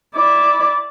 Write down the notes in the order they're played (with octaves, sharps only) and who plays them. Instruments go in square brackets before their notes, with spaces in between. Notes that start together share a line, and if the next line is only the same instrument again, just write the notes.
[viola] E4 D5